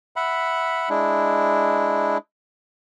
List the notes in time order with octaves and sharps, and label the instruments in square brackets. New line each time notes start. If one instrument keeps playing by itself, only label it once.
[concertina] E5 F#5 B5
G#3 D4 E4